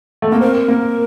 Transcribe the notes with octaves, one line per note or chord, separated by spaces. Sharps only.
A3
A#3 A4
C4 A#4
A#3